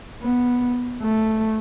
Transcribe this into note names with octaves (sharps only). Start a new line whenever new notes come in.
B3
A3